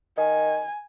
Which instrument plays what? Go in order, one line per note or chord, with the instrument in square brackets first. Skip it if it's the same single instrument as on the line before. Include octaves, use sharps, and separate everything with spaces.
[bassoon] D#3 [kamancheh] G#5